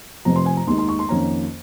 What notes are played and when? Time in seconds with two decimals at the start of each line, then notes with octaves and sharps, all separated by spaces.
0.25 F1 F2 C3 F3 A#5
0.36 C6
0.46 G#5
0.57 A#5
0.67 D#2 D#3 G#3 D#4 C6
0.78 C6
0.88 C#6
0.99 C6
1.09 F2 D#3 A#3 C#4 A#5